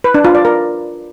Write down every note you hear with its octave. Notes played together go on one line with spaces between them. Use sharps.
B4
D4
F4
D5
A#4